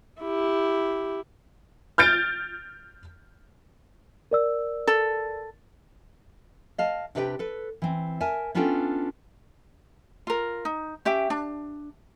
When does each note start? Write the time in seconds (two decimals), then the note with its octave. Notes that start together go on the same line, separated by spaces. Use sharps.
0.22 E4 G4
1.98 F6 G6 A6 D7
4.31 A#4 D5 E6
4.87 A4
6.78 D#5 F5 A5
7.15 C3 D4 G4 B4 D#5 G5
7.39 A4 B4
7.82 E3 C4
8.20 A#4 E5 G#5 A5
8.55 B3 C#4 D4 F4 A4 G5
10.27 F4 A#4
10.65 D#4
11.05 C#4 G4 E5 G5
11.30 D4